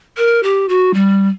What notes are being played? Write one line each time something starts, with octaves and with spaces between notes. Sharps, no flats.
A#4
G4
F#4
G3